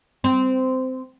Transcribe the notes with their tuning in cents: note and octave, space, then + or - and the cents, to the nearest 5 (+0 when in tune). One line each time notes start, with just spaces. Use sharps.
C4 -15